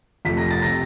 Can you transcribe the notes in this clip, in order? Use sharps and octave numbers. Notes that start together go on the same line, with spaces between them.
F1 F2 C3 F3 A3 B6
A#6
A6
C3 A#6